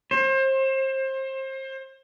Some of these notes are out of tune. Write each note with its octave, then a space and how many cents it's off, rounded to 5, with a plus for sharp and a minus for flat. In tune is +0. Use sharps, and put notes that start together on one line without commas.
C5 +30